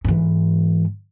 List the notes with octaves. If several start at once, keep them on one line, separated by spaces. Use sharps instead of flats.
G#2 E3